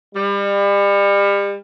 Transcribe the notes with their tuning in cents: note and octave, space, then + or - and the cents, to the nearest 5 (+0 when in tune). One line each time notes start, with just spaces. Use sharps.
G3 +35